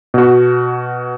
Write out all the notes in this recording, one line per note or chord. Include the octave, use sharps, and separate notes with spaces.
B2 F#4